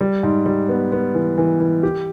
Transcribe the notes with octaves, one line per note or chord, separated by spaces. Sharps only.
G3
G#2
G3
B3
B3
E3
E3
E3
G4